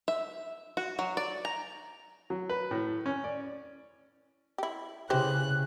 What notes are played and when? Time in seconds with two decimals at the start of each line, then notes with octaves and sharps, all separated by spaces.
0.08 E5
0.77 F#4
0.99 F#3
1.17 D5
1.45 A#5
2.30 F#3
2.49 B4
2.71 A2
3.06 C#4
3.24 D5
4.58 E4 G4
5.10 C#3 E3 G4 C5 F#6